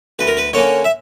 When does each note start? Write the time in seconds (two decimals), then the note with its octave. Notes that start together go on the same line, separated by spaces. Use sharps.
0.19 D2 B4
0.27 A#4
0.37 B4
0.53 D3 A#3 C#4 C#5
0.84 E5